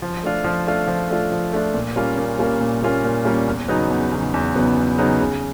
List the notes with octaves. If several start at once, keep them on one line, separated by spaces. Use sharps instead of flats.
F3
A3 D4 F4
F3
A3 D4 F4
F3
A3 D4 F4
F3
A3 D4 F4
A#2
G3 A#3 C#4 F4
A#2
G3 A#3 C#4 F4
A#2
G3 A#3 C#4 F4
A#2
G3 A#3 C#4 F4
E2
C#3 F#3 B3 D#4
E2
C#3 F#3 B3 D#4
E2
C#3 F#3 B3 D#4
E2
C#3 F#3 B3 D#4
C#3